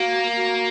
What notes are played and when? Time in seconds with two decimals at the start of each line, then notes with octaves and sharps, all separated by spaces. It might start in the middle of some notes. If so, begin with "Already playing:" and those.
Already playing: A#3 F#4
0.36 F#4